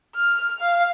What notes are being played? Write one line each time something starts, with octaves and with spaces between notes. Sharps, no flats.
F6
F5